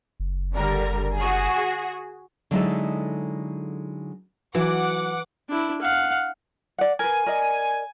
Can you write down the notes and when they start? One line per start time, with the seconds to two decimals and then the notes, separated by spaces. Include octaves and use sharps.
0.20 F#1
0.53 D3 G3 A#4
1.17 F#4 G#4
2.51 D3 F#3 G#3 D#4 E4 A4
4.55 E3 F#3 F#5 D6
5.50 D4 E4
5.82 F5 F#5
6.78 D5 F#5
6.99 A#4 B4 G#5
7.26 A#4 D5 D#5